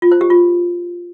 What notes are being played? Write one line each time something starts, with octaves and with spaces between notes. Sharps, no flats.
F4
C5
G4
F4